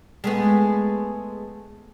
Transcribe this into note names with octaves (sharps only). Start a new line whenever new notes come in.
G#3 A3 B3